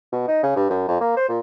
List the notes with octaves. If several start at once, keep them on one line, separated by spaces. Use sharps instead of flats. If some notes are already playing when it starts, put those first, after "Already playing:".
B2
D#4
C#3
G2
F#2
F2
A#3
C5
A#2